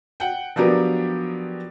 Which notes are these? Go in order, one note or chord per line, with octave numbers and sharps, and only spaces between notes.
F#5 G5
F3 F#3 B3 D4 G4 A#4